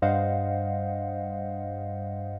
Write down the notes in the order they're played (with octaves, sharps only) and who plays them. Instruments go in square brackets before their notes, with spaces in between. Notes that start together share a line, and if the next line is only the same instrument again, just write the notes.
[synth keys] G2 G3 C5 D#5 F5 F#5